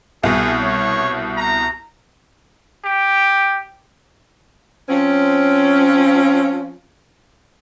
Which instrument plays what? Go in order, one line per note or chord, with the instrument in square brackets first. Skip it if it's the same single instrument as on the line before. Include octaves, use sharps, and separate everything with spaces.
[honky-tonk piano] C2 B2 [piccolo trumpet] G#4
[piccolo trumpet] C#5
A#5
[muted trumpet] G4
[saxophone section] F3 C4 C#4